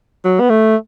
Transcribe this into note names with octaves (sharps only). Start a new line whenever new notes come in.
F#3
B3
A3